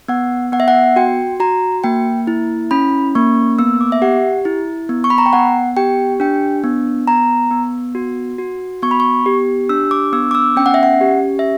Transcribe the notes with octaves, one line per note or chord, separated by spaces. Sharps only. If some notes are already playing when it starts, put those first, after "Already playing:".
B3 F#5
B3 F#5
E5
F#5
F#4 G5
F#4 A#5
A#3 G5
E4
C#4 B5
A#3 C#6
B3 E6
D6
E5
G4 F#5
E4
B3
C#6
B5
A#5
G5
B3 F#5
G4 G5
D4 G5
B3
B3 A#5
B3
F#4
F#4
B3 C#6
B5
C#6
G4
D4 E6
D6
B3 E6
D6
E6
C#4 G5
F#5
E5
F#5
G4
E5